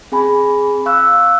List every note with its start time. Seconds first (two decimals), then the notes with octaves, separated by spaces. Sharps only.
0.12 C4 G#4 G#5 B5
0.86 F5 C#6 E6 F#6